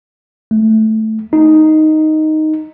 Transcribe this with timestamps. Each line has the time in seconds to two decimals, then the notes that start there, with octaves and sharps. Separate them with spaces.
0.51 A3
1.33 D#4